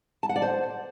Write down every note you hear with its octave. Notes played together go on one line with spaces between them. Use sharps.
A5
F#5
D5
C5